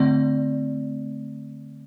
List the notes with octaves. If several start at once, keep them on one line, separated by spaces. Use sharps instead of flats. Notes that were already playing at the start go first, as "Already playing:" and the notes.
Already playing: D3 A3 C4 D5